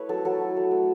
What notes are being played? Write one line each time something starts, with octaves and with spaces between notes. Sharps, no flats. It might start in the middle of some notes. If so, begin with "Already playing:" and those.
Already playing: A3 E4 B4 C#5
F#3 A4
F#3 A4
E4
A3
A3